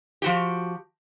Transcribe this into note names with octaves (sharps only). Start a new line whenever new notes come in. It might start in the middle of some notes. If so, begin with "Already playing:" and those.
F3 F#4 G4